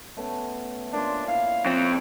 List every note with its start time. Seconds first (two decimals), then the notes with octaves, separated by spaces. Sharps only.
0.17 A3 B3 C#4
0.93 A#2 C#4 D4 C6
1.27 E4 F5
1.65 F2 C4